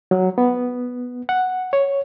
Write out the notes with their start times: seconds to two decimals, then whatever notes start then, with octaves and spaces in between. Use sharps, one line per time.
0.11 F#3
0.38 B3
1.29 F#5
1.73 C#5